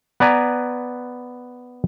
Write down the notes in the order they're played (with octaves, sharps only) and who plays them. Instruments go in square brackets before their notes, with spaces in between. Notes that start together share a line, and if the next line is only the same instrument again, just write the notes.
[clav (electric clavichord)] B3 B4 D5 G#5 A#5